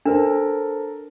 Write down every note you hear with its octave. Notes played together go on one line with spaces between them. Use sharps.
D4 A4 A#4 C5